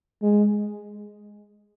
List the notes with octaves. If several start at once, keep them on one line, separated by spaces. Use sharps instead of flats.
G#3